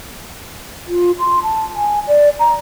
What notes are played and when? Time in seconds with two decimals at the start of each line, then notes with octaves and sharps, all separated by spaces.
0.88 F4
1.19 C6
1.43 A5
1.75 G#5
2.08 D5
2.39 A#5